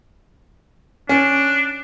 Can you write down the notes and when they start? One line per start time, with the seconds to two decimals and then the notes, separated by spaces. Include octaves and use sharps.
1.09 C#4 D4